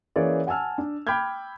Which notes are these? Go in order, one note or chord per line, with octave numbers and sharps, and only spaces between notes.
E3 A#3 C#4 G#4 C#5 D5
F#5 G#5 A5 E6 F6
D4
G5 B5 D6 F6 G6 G#6